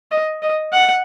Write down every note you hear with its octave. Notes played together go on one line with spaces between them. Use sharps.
D#5
D#5
F#5